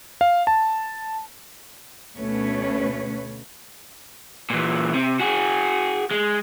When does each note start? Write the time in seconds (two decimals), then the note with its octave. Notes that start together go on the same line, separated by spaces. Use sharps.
0.21 F5
0.47 A5
2.17 D2 B2 A3 C#4 B4 C#5
4.50 A#2 E3
4.94 C3
5.20 F#4 G#4
6.11 G#3